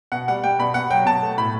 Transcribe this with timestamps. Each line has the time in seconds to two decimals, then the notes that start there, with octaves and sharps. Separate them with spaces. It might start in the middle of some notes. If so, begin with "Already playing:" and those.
0.12 B2 F#5
0.28 G3 F#5
0.44 G3 G5
0.59 B2 B5
0.74 B2 F#5
0.90 F#3 G5
1.05 B2 A5
1.22 A3
1.38 A2 B5